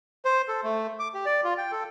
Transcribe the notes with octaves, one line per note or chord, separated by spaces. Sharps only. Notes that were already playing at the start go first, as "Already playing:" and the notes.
C5
A4
A3
D6
G4
D5
F4
G5
A4